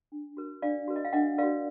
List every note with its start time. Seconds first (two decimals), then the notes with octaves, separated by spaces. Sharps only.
0.12 D4
0.37 F#4 A#4
0.62 D4 D5 F5
0.88 F#4 A#4
0.96 D#5
1.05 F5
1.13 D4 D#5 F#5
1.38 F#4 A#4 D5 F5